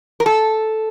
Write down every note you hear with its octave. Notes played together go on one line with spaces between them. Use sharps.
A#4
A4